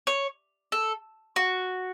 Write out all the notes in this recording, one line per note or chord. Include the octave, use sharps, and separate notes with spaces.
C#5
A4
F#4